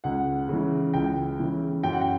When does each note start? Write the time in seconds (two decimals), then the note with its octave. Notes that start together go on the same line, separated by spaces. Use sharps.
0.04 C#2 F#5
0.49 C#3 E3
0.94 C#2 G5
1.39 C#3 E3
1.83 F#2 G5
1.93 F#5
2.01 G5